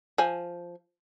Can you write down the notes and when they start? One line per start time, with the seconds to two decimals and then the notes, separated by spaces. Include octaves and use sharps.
0.18 F3 G#5